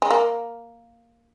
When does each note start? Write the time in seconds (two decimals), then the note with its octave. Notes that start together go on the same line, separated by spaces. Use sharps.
0.02 G#3
0.11 A#3